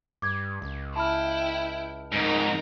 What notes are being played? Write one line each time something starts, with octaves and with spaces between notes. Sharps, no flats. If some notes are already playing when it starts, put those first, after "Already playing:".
G2 D6 G#6
C#2
E4 G5 A5 B5 F6
F2 G#2 D#4 A#4